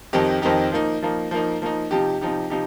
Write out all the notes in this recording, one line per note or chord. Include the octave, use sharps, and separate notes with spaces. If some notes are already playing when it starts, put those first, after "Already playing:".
F2 D#3 C4 D#4 G4
F2 D#3 C4 D#4 G4
F3 A#3 D#4
F3 A#3 D#4
F3 A#3 D#4
F3 A#3 D#4
C3 F3 D#4 G4
C3 F3 D#4 G4
C3 F3 D#4 G4